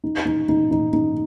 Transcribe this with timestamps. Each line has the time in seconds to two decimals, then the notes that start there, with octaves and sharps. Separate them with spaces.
0.04 D#4
0.26 D#4
0.49 D#4
0.71 D#4
0.93 D#4